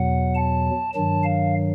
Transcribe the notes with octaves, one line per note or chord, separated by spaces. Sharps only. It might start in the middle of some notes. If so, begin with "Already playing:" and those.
Already playing: E2 B2 F#3 F#5
A5
G2 D#3 F#3 A5
F5